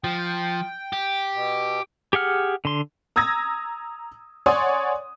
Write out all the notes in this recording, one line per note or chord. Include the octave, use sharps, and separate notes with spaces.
F3 G5
G4
B2
G4 G#4 F#5 F6
D3 C6
A#5 D#6 E6 G#6 A#6
C#5 D5 F#5 G#5 C6 D#6